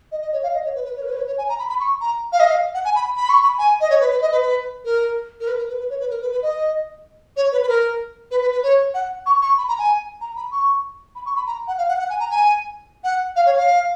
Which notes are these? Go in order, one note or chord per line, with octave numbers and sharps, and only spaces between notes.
D#5
D#5
C#5
F5
D#5
C#5
B4
B4
C#5
A#4
B4
C#5
B4
C#5
G#5
A#5
B5
B5
C#6
A#5
F5
D#5
F5
F#5
G#5
B5
B5
C#6
B5
G#5
D#5
C#5
B4
B4
D#5
B4
B4
A#4
A#4
B4
A#4
B4
B4
C#5
B4
A#4
B4
B4
D#5
C#5
B4
B4
A#4
B4
B4
B4
C#5
F#5
C#6
C#6
B5
A#5
G#5
A#5
B5
C#6
B5
C#6
B5
A#5
F#5
F5
F#5
F#5
G#5
A#5
G#5
F#5
F5
C#5
F5